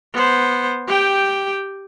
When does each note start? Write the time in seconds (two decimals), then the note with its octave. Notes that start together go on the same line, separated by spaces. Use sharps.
0.14 B3 C5
0.88 G4 G5